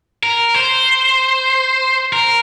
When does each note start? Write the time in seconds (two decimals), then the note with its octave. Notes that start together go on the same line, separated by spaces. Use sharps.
0.23 A#4
0.54 C5
2.13 A#4